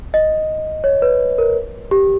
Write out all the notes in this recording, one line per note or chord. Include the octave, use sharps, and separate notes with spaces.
D#5
C#5
B4
A#4
G4